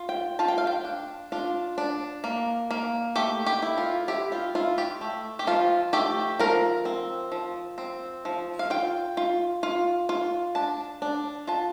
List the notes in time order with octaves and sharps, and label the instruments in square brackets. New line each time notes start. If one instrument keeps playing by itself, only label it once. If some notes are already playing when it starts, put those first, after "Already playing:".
Already playing: [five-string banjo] F4
G5
F4 A5
G5
F5
G5
D4
D4 F4
D4
A#3
A#3
A3 G4
G4
E4
F4
E4 G4
F4
E4 F4
G4
A3
G4
F3 F4
A3 G4
F3 A#4
C4
F3
C4
F3
F5
F4 G5
F4
F4
F4
D4 A5
D4
F4 A5